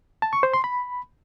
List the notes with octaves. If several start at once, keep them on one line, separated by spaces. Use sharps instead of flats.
A5
C#6
C5
C6
B5